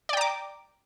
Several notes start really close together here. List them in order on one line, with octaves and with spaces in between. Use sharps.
D5 G5 A#5 D6